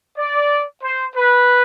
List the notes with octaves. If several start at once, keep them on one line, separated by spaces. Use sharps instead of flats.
D5
C5
B4